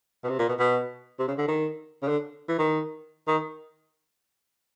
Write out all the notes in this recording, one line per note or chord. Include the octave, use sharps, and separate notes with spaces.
B2
C3
A#2
B2
B2
C3
C#3
D3
D#3
C#3
D3
E3
D#3
D#3